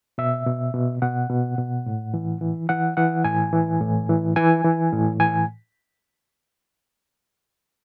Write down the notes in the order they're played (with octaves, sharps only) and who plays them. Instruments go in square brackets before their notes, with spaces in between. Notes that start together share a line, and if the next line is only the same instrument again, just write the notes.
[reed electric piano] B2 E5
B2
B2
B2 F#5
B2
B2
A2
E3
E3
E3 F#5
E3 F#5
A2 G#5
E3
A2
E3
E3 G#5
E3
A2
E3 G#5